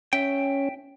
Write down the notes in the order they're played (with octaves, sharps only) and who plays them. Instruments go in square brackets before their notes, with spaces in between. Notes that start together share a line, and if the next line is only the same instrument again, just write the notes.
[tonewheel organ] C#4 [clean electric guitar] E5 G5